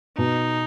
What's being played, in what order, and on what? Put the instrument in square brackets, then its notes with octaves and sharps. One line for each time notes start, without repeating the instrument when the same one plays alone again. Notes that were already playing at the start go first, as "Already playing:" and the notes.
[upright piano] B2 [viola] D#4